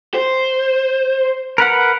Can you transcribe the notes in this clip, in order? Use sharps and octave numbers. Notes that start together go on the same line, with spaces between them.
C5
A#4 B4 F#5